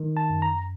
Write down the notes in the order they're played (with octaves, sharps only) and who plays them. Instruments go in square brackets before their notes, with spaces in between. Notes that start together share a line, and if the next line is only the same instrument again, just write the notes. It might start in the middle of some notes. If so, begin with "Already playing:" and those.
Already playing: [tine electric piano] D#3
A5
F#2
A#5